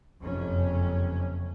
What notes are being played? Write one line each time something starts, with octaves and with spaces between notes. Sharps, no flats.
F#1 F2 C3 C#4